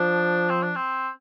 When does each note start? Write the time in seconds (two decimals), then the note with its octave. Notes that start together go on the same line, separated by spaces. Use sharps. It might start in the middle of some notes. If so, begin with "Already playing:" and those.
Already playing: F3 D4
0.50 C4
0.62 D4
0.76 C4